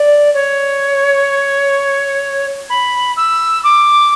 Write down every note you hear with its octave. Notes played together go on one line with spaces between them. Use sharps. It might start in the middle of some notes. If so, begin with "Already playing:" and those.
Already playing: D5
C#5
B5
E6
D6